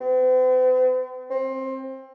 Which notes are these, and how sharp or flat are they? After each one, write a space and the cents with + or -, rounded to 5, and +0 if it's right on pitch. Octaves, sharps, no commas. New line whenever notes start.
C4 -45
C4 +20